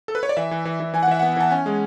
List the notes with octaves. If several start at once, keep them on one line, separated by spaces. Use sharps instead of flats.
A4
B4
C#5
D5
E3 E5
E3
E3
E3
E3 G#5
F#5
E3 E5
B3 F#5
E3 A5
C#4 G#5
G#3